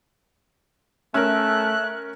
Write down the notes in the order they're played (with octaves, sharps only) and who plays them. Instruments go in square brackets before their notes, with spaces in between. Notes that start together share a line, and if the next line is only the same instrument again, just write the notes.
[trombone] A3 [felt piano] C#4 A#4 [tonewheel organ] E5 [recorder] F#6